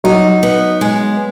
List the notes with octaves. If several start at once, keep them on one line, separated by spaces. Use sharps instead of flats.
F#3 D#4
B3
G#3